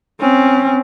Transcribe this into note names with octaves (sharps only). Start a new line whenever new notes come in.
C4 C#4